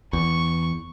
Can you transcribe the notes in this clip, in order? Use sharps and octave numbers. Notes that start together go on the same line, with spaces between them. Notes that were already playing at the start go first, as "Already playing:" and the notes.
E2 C#6